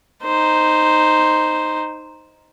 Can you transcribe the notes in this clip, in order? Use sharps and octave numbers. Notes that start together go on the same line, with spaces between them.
D#4 C5